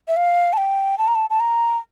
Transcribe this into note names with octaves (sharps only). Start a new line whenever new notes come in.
E5
F5
A5
G5
A5
A#5
A5
A5
A#5